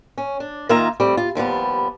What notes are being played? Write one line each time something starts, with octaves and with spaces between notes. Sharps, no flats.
C#4
D4
D#3 A#3 D#4 F4 E5 A#5
G3 A3 C4
F4
D#2 F3 G3 B3